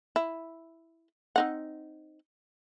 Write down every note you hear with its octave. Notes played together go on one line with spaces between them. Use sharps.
E4
C4 D#4 F#5